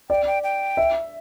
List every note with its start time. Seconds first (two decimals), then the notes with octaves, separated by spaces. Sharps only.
0.10 D5 G5
0.27 G5
0.44 G5
0.77 E5